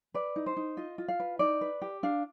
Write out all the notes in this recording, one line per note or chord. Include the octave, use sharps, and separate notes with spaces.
B4 D5
D#4
C5
D#4
F4 D#5
F4
F5
B4
D#4 D5
B4
G4
D4 F5